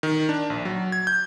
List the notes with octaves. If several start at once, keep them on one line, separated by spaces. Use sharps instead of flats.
D#3
D4
A#1
F#3
G#6
G6